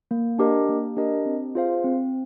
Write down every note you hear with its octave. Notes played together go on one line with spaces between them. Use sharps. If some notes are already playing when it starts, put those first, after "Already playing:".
A#3
D4 G4 A#4 D#5
A#3
D4 G4 A#4 D#5
C4
F4 G#4 C5 F5
C4